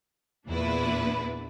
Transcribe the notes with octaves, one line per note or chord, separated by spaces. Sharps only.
E2 A#2 D4 E4 B4